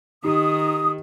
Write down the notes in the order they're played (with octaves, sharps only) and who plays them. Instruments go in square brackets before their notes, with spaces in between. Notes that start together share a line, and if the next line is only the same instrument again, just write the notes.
[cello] D#3 [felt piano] D#4 G4 [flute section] D#6